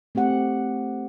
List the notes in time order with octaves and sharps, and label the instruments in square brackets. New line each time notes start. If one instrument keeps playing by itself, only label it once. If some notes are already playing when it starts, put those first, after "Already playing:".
[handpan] A3 C4 G4 F#5